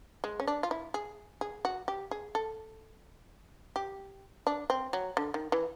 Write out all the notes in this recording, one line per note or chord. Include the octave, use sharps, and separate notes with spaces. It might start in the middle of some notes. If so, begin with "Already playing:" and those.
G#3
C#4
D4
F4
E4
G#4
G#4
F#4
G4
G#4
A4
G4
D4
C4
F#3
D3
D#3
E3